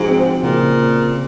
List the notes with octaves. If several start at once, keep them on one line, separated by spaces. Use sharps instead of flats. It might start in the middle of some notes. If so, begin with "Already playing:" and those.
Already playing: G#2 F3 F#4
C4
A#2 C#3